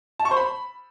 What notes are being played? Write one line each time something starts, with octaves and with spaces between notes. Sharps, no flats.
A5
C#6
C5
B5